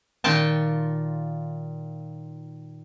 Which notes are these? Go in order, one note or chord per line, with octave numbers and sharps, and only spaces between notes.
A#2 D#3 F4 G5 A5